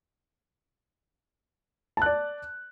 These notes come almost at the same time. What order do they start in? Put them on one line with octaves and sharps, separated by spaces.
A5 F#6 D5